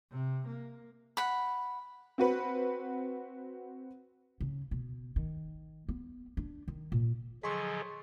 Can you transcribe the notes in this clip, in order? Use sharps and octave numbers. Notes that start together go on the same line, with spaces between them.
C3
A#3
F#5 B5
C4 F#4 B4
C#3
B2
D#3
B3
D4
D#3
A#2
D3 F3 F#3 G#4 D#5 C6 C#6 B6